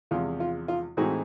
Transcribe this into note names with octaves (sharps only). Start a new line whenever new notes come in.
E2 C3 F3 G#3 F4
F4
F4
A2 E3 G#3 C4 D#4 F#4